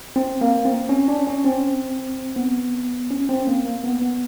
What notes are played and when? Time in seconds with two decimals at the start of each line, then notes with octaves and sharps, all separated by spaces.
0.16 C4
0.41 A#3
0.65 C4
0.89 C#4
1.08 D4
1.27 C#4
1.45 C4
2.36 B3
3.11 C#4
3.29 C4
3.47 A#3
3.65 A#3
3.84 B3
4.02 B3